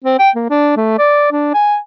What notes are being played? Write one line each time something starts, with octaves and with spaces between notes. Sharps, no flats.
C4
G5
A#3
D4
A3
D5
D4
G#5